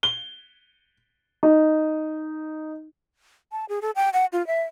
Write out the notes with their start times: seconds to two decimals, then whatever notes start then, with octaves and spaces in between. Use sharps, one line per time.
0.03 G7
1.43 D#4
3.52 A5
3.69 G#4
3.82 A4
3.96 G5
4.13 F#5
4.32 F4
4.47 E5